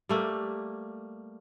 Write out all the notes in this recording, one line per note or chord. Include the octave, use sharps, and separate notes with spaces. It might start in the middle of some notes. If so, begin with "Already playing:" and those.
G3 A3 A#3